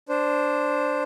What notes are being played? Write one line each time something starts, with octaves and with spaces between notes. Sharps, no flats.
D4 C5